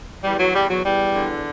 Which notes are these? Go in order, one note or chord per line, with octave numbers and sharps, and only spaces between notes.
E2 G3
F#3
E2 G3
F#3
E2 G3
D3